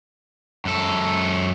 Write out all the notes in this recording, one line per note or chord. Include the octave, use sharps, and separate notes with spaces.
F#2 A4